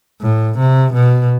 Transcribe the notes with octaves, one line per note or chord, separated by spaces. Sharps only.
A2
C3
B2